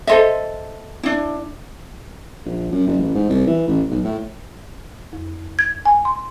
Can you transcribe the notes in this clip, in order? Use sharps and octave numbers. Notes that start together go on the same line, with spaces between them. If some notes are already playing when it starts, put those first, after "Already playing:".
A4 C5 D#5 E5
D4 E4
A#1
F#2
F#1
A1
G#2
C2
E3
A1
B1
A2
F2
G#6
G#5
C6